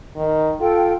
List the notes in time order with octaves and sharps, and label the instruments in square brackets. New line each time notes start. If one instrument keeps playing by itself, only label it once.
[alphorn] D#3
[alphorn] F4 [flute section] A4 G5